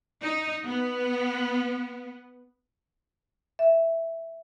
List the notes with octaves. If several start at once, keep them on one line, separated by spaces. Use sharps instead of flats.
D#4
B3
E5